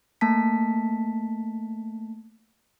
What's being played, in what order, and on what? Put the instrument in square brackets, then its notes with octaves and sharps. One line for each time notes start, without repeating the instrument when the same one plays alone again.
[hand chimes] A3 A#3 A5 B6